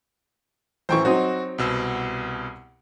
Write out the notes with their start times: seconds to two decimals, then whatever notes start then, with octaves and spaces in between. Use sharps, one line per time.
0.89 A1 E3 C5 G5 C#6
1.05 F#3 C4 D#4 F#4
1.58 C2 B2 E6